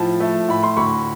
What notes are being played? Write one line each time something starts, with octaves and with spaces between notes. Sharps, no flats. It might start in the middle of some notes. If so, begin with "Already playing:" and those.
Already playing: A2 F3 A5 B5
A3
A2 B5
C6
D2 B5 C#6